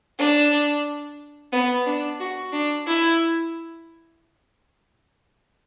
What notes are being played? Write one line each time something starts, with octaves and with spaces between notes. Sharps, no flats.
D4
B3
D4
F#4
D4
E4